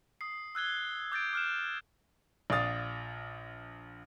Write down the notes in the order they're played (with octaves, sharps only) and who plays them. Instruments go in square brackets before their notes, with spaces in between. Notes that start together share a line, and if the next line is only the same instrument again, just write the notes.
[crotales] D#6 C7
E6 F#6 G#6 G7
D6 G6 A6 D7
D6 F6 F#6 E7
[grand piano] A#1 D5 F5 D#6 A6